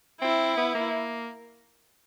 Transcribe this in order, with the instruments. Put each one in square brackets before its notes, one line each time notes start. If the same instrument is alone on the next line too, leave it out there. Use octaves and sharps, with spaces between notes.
[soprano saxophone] C4 [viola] E4
[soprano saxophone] B3
A#3